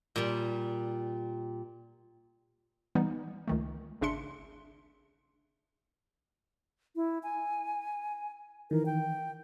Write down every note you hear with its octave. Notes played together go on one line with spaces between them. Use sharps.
A#2 G3
E3 G3 B3 D#4
C#2 D#3 A3
G#1 C#3 D4 E5 C6 C#7
E4
G#5
D#3 E3 A#4
G5